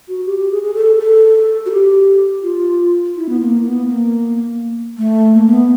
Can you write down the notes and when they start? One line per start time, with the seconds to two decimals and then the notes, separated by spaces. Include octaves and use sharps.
0.08 F#4
0.26 G4
0.38 G4
0.51 G#4
0.63 G#4
0.75 A4
0.99 A4
1.66 F#4
1.71 G4
2.43 F4
3.17 E4
3.29 B3
3.41 A#3
3.65 B3
3.89 A#3
4.98 A3
5.34 A#3
5.47 A#3
5.51 B3